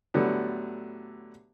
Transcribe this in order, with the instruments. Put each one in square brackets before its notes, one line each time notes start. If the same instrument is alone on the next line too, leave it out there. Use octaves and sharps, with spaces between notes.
[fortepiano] A2 D3 F#3 G3 B3